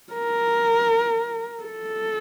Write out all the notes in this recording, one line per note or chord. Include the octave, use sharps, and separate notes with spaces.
A#4
A4